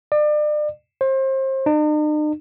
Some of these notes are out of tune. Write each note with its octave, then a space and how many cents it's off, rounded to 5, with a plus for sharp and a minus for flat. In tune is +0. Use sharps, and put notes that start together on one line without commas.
D5 +35
C5 +30
D#4 -45